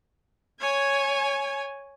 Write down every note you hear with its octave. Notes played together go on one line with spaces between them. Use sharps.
C#5 G#5